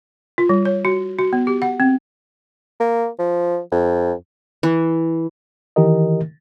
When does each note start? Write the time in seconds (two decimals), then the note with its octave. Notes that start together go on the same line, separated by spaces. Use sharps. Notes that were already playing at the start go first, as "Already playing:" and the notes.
0.38 F4
0.49 G3
0.65 C#5
0.85 F#4
1.19 F#4
1.33 B3
1.47 G4
1.62 F#5
1.80 C4
2.80 A#3
3.19 F3
3.72 F2
4.63 E3
5.76 D#3 E3 G4 A#4 D#5